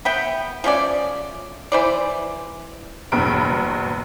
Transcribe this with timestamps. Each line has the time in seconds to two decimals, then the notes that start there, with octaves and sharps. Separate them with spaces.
0.05 B3 E5 G5
0.64 F3 A3 C#4 D5
1.72 E3 C5 D5
3.12 F#1 E2 G2 B2 B5 D7